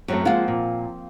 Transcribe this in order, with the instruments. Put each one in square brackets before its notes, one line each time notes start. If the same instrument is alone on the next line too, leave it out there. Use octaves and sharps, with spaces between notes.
[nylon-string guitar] F#2 F#3 A3 [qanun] C4
[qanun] F3 A#3 [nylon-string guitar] G#3 F4 F#5
[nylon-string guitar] A#2